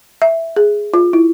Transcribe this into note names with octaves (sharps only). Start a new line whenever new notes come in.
E5
G#4
F4
E4